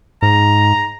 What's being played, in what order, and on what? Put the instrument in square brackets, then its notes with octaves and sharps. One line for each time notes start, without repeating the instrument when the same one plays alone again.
[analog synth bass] G#2 [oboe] A#5